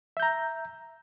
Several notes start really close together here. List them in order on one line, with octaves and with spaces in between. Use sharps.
E5 G6 A#5